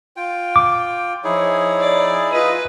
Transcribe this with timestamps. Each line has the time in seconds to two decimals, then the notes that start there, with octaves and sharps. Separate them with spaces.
0.16 F4 G5
0.56 D6
1.24 F3 D#4 E4 G#4 C#5
1.80 D5
2.32 F4 B4 D#5 D#6